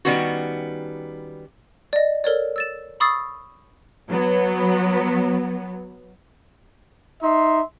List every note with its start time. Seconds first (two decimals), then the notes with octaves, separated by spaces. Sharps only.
0.05 D#3 G3 G#3 B3 C#4 F#4
1.93 D5 D#5
2.24 A4 A#4 C#5 D5
2.56 E6 A6 E7
3.00 B5 C#6 D#6 E6 A6 C7
4.09 F#3 B3
7.23 D#4 E5 C6